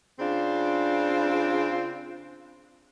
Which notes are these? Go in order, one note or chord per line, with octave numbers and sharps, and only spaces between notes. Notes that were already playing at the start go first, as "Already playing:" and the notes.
C#3 C4 D4 F4